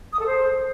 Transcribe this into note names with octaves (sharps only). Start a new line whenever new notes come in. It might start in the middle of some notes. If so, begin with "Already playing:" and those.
D#6
A4
C5